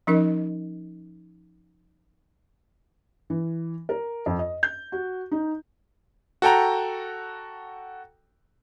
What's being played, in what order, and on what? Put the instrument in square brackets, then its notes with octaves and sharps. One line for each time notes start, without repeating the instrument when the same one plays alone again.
[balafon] F3 C#4 D#4 A#4 D#5
[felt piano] E3
A#4
F2
D#5
G6
F#4
D#4
[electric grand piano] F#4 A4 G5 A#5